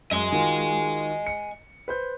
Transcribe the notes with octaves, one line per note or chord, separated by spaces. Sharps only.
F#2 D#5 G#5
D#3 F4 F#4
C#7
B4 C5 G6